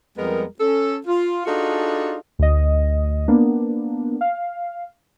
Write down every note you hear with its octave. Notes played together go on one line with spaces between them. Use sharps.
F2 G3 G#3 B3 A#4
C#4 A4
F4
D4 D#4 F4 F#4 G#4 A4
D2 D#5
A#3 B3 D4
F5